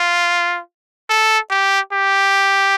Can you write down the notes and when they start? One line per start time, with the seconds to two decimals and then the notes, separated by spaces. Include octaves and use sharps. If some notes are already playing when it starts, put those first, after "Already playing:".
Already playing: F4
1.09 A4
1.51 G4
1.93 G4